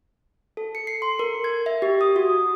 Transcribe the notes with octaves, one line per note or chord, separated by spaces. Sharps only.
A4
C#7
C7
C6
A#4
G#6
E5
G4
D#6
F#4